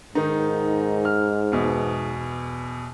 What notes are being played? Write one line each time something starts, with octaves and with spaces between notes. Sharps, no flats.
G#2 D#3 D#4
F6
E2 B2